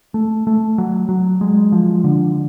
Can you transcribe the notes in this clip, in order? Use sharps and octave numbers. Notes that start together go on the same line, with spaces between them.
A3
A3
F#3
F#3
G#3
F3
D3